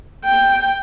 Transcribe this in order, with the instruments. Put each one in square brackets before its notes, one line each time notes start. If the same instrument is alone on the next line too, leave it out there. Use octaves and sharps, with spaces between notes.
[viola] G5